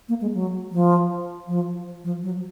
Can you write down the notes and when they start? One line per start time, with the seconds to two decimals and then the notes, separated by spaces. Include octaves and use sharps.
0.09 A#3
0.21 G#3
0.34 F#3
0.72 F3
1.48 F3
2.04 F3
2.23 F#3